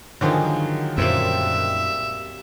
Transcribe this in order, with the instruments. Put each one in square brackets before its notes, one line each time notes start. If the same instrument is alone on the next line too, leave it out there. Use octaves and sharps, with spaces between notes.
[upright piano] D3 D#3 F3 [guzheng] F#3 G#3 A#3
[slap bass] F#2 A#2 [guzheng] G3 A#3 C4 [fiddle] E5